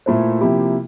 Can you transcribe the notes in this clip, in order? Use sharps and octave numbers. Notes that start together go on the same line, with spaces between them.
A#2 A3 E4 A4 C5
C3 F3 A#3 E4 G4